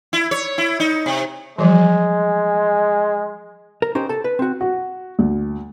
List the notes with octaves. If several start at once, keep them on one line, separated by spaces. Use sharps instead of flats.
E4
C#5
E4
D#4
C3
E3 F3 G3 G#3
A#4
C#4 D#4 G4 A#4 C5
A4 A5
B4
C4 F#4
F#4
D2